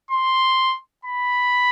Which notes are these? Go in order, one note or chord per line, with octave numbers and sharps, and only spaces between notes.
C6
B5